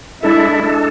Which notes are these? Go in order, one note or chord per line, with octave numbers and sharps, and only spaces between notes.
G#3 D4 E4 A4
G#3 D4 A4